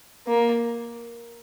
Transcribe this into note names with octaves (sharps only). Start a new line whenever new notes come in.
A#3